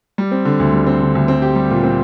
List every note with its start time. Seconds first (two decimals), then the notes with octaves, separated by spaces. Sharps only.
0.18 G3
0.31 C4
0.45 D3
0.60 D2
0.73 G3
0.86 C4
1.01 D3
1.15 D2
1.28 C4
1.42 G4
1.56 G3
1.70 A#2
1.84 C4